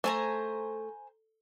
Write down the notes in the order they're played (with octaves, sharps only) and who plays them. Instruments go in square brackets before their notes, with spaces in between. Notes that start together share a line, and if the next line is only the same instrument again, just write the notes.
[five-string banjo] A3 [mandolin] C5 G#5 A#5